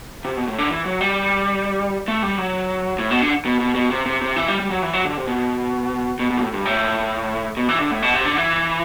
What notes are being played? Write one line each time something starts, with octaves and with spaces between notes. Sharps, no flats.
C3
B2
A2
D3
E3
F#3
G3
A3
G3
F#3
A2
B2
D3
B2
B2
B2
C3
C3
C3
E3
G3
G3
F#3
E3
F#3
D3
C3
B2
B2
B2
G2
A2
G2
A2
B2
E3
D3
A2
B2
C3
D3
E3